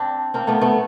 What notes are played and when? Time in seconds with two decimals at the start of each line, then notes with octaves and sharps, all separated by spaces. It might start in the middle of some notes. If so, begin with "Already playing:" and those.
Already playing: C4 D4
0.34 A#3 C4
0.47 A3 B3
0.61 A3 B3